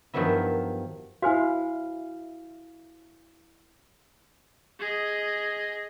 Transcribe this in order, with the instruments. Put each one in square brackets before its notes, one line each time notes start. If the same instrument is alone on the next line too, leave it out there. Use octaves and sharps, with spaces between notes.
[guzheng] G2 D#3 F3 F#3 B3 E4
[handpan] E4 F5 [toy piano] F#4 C5 G#5
[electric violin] G#4 D#5